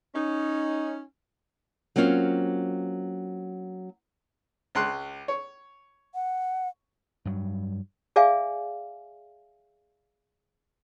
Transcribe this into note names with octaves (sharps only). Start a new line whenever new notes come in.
C#4 D#4
F#3 A#3 C4 C#4 F4
C#2 C6 F#6
C#5
F#5
G2 F#3
G#4 D5 E5 F5 G#5